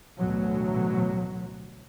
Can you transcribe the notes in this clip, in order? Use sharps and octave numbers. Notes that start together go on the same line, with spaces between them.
A1 D2 B2 F#3